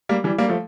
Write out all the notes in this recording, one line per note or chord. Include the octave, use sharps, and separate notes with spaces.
G3 A#3
E3 G3
G3 A#3
F3 A3